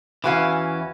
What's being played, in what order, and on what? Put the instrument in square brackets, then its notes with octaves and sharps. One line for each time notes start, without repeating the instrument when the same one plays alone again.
[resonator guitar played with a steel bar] E2 F#4 F5 [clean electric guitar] E3 C#4